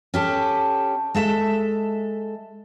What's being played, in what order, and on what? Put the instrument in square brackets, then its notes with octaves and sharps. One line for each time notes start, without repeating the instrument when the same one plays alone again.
[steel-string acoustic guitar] C#4 G4 A4
G#3 A4 E5